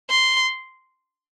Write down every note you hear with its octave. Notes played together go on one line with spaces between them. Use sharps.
C6